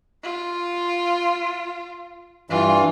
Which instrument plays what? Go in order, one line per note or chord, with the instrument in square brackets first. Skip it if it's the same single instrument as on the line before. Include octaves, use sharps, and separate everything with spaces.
[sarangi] F4
[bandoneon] G2 E3 [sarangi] F4